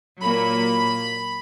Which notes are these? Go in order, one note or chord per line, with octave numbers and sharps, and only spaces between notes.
A#2 F#3 A#3 B5